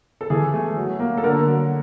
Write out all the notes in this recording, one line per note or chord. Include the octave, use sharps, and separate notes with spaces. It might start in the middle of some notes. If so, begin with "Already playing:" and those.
A4
E3 G#4
A3
F#3
A#3
A4
D3 A#4
F#3